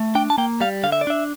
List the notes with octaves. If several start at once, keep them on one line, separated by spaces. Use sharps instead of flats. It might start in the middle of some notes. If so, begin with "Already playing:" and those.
Already playing: A3
D4 G5
A5
A#3 G5
G3 F5
D3 F5
E5
D5
D4 E5